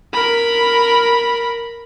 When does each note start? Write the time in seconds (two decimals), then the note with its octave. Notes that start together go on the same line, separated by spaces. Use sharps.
0.13 A#4 B5